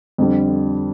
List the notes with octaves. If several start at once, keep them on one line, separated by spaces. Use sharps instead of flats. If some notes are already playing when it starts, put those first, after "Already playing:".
F2 D3 G3